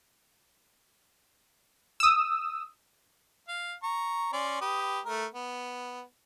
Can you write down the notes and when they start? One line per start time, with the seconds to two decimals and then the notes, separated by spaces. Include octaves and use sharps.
2.00 D#6 E6
3.48 F5
3.83 A#5 C#6
4.33 C#4 D5 C6
4.61 G4 B4 D#6
5.05 A3 A#4
5.34 B3